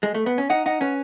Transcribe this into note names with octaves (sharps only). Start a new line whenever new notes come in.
G#3
A3
B3
C#4
D#4 F#5
D#4 F#5
C#4 B4